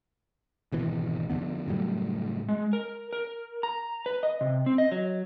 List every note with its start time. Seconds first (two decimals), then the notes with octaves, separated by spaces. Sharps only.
0.72 G#1 B2 E3
1.30 F2 D3 B3
1.68 F#1 A2 F#3 G3
2.49 G#3
2.73 A#4
3.13 A#4
3.63 A#5
4.06 B4
4.23 D#5
4.41 C3
4.66 C4
4.78 D#5
4.92 F#3